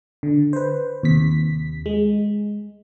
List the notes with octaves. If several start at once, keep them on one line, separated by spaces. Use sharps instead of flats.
D3
B4 C5
D#2 C3 B6
G#3